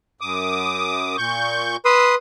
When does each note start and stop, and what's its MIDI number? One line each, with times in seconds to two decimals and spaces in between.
0.21 1.17 42
0.21 1.17 86
0.21 1.17 87
1.18 1.77 46
1.18 1.77 85
1.18 1.77 91
1.85 2.15 71
1.85 2.15 84
1.85 2.15 87
1.85 2.06 88